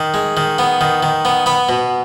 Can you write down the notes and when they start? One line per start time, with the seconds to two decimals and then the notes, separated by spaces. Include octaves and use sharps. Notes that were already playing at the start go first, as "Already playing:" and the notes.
Already playing: D#3
0.14 G#3
0.37 D#3
0.59 B3
0.81 D#3
1.03 D#3
1.25 B3
1.46 B3 B5
1.69 B2